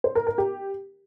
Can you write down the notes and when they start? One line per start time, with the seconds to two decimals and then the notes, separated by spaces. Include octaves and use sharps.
0.04 C5
0.15 A#4
0.27 A#4
0.38 G4